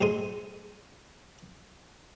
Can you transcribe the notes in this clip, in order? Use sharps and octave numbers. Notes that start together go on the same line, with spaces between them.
D2 A2 G#3 G#5 C6